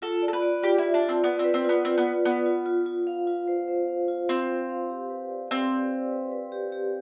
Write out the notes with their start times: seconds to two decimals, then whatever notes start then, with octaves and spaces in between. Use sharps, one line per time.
0.02 F4 A4
0.22 D5
0.28 A4
0.33 B4
0.42 D5
0.63 F4 G4
0.78 E4 F4
0.94 D4
1.04 F4
1.09 C4
1.24 B3 D5
1.39 C4 B4
1.54 C4
1.65 B3 F4
1.85 C4 F4
1.98 B3
2.05 F4
2.25 B3 D5
2.46 F4
2.66 F4
2.86 F4
3.07 F5
3.27 F4
3.47 C5
3.68 C5
3.88 F5
4.08 F4
4.29 C4 C5
4.49 F4
4.69 F5
4.90 G4
5.10 B4
5.30 D5
5.51 C4 D5
5.71 D5
5.91 D5
6.12 B4
6.32 B4
6.52 G4
6.72 G4